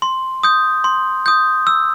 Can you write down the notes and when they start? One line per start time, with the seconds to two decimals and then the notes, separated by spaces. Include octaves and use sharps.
0.02 C6
0.43 D#6 G6
0.84 C6
1.26 D#6 G6
1.67 E6